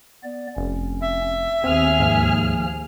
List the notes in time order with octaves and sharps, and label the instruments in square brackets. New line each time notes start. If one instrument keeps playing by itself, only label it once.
[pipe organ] B3 D5
[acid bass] F1 [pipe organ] C#4
[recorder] E5
[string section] D#2 G#4 F6 [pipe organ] B3 [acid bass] C4
[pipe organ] D2 F3 A#3 [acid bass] G#2